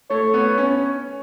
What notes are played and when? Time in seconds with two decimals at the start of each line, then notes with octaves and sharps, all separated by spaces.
0.10 A3 C#5
0.34 B3
0.58 C#4